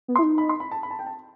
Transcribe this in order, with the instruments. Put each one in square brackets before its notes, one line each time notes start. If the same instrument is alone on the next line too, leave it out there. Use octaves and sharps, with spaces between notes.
[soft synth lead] B3
[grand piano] C6
[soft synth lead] E4
D#4
[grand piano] B5
C6
B5
A5
B5
A5
G5
A5